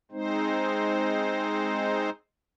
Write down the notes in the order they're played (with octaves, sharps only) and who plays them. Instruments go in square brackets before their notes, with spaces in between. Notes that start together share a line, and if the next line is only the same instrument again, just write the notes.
[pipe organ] G#3 C4 D#4 C5